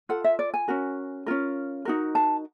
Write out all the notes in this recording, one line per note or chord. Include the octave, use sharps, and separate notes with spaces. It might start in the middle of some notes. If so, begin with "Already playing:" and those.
F4 A4 F#5
E5
D5
G#5
C#4 F#4 A#4
C#4 F4 A#4
D#4 F#4 A#4
A5